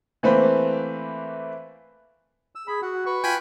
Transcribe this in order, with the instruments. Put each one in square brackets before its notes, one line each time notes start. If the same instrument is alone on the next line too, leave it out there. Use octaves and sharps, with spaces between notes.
[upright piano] E3 A3 A#3 C4 B4 C5
[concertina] E6
[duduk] G#4 [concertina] B5
[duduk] F#4 [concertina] F#5
[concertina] B4 C#6
[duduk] F4 [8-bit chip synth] G5 G#5 B5